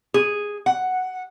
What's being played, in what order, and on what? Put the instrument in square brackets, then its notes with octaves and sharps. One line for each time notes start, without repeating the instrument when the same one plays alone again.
[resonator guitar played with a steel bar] G#4
F#5